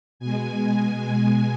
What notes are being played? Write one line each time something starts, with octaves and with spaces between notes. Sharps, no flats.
B2 G#3 G#5
G#5
B2 G#3